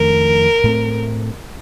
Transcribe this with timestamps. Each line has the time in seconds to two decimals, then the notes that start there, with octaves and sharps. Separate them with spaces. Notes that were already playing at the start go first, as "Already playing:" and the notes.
Already playing: F2 D#3 A3 D4 A#4
0.63 A2 A3 C4